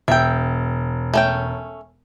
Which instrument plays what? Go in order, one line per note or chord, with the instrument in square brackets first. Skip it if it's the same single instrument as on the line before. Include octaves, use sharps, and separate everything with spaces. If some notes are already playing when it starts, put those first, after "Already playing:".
[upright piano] E1 [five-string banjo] E5 G5
[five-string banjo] A3 C#4 G5